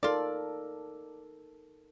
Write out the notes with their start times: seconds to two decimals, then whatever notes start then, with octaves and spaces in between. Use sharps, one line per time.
0.03 D#4 F4 A4 A#4 D5